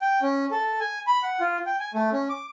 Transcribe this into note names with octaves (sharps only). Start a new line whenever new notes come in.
G5
C#4
A4
G#5
B5
F#5
F4
G5
G#5
A3
C#4
D6